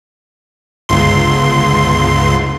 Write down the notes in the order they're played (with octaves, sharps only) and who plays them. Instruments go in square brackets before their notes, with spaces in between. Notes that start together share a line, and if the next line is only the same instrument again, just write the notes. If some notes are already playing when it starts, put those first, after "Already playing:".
[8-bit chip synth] G1 C#2 C6